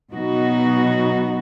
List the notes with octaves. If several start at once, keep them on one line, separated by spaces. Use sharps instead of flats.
B2 F#3 B3 D#4 F#4